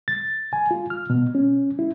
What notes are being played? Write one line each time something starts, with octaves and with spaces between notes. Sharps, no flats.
A6
G#5
F4
F6
B2
C#4
E4